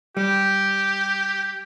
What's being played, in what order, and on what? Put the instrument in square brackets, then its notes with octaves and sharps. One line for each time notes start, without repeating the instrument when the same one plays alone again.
[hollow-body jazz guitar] G3 [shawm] G4